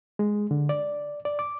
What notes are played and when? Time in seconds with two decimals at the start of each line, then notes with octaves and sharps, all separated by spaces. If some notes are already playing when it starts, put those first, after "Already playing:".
0.19 G#3
0.51 D3
0.69 D5
1.25 D5
1.39 D6